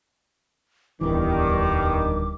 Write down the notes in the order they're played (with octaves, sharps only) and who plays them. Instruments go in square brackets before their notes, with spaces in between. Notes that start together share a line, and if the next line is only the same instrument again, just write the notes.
[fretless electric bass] D1 E3 [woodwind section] E2 G3 [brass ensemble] G2 D#3 [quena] D6